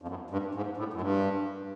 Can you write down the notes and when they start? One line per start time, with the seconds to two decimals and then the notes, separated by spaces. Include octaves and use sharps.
0.02 F2
0.08 F#2
0.30 G2
0.55 G#2
0.77 A2
0.93 F#2
1.01 G2